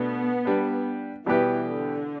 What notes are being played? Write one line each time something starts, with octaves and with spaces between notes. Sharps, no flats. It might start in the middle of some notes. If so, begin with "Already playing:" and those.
Already playing: B2 A3 B3 D4
G3 D4 B4
B2 E3 G3 B3 G4 B4
D3